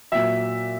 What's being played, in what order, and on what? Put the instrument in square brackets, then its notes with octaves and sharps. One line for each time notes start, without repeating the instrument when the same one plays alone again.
[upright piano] A#2 F#3 E5